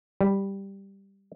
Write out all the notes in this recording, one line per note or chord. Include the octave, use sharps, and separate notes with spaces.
G3